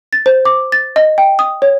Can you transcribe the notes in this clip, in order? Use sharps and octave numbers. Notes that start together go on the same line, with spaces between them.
A6
C5
D6
A6
D#5
G5
D#6
C#5